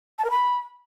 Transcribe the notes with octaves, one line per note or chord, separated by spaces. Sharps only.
A5
A#4
B5